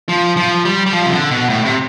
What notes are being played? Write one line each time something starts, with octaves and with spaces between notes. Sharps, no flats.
F3
F3
G3
G3
F3
C3
D3
B2
A2
C3